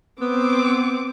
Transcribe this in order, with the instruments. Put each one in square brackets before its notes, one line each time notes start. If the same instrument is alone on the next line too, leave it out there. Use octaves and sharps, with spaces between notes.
[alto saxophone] B3 [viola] C4 D6